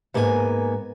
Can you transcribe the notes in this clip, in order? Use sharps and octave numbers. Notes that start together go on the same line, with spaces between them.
G#2 A#3 B3 A4 G#5